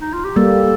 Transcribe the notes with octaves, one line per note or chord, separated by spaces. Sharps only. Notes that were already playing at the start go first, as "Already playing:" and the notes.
D#4
F4
G4
G3 A#3 A4